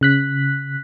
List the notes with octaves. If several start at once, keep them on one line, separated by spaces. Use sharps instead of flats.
C#3 F#6 B6